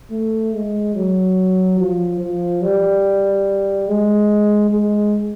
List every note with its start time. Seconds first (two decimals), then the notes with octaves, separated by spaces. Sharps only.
0.11 A3
0.53 G#3
0.95 F#3
1.79 F3
2.20 F3
2.62 G3
3.88 G#3
4.71 G#3